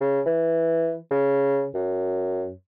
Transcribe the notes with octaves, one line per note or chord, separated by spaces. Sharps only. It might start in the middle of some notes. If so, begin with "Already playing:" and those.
C#3
E3
C#3
F#2